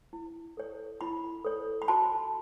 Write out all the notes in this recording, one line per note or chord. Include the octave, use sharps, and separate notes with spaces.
E4
A4 C#5
E4 B5
A4 C#5
B5
F#4 A5